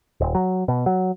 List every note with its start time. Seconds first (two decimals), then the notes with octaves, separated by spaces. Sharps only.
0.21 D#1
0.35 F#3
0.68 B2
0.86 F#3